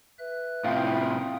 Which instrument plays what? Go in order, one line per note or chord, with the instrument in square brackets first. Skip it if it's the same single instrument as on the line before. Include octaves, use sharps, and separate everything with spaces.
[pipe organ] B4 E5 F#6
[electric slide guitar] A2 C3 [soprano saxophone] E4 [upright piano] F4 [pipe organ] G5 D#6